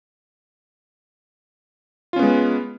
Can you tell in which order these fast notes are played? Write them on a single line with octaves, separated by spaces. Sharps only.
F4 C#4 B3 G#3